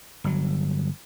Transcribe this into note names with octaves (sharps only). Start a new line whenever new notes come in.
G1 F#3